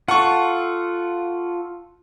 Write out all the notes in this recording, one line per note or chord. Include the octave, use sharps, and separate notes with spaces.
F4 A4 F#5 C#6